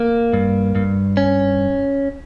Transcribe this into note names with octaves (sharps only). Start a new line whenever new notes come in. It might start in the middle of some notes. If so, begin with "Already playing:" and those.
Already playing: A#3
G2
G2
C#4